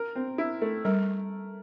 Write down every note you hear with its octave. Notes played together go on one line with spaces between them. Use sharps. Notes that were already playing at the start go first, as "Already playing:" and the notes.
Already playing: A#4
C4
E4
A3
G3 A#4